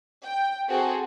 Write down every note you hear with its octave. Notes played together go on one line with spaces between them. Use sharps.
G5
C4 F#4 G#4 A4